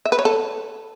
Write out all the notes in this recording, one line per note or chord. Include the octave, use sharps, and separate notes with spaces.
E5
B4
C#5
A4